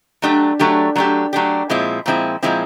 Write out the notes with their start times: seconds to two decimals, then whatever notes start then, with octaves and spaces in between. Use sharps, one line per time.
0.22 F#3 A3 D4 G4
0.59 F#3 A3 D4 G4
0.95 F#3 A3 D4 G4
1.33 F#3 A3 D4 G4
1.70 A#2 F3 G#3 C4 E4
2.06 A#2 F3 G#3 C4 E4
2.43 A#2 F3 G#3 C4 E4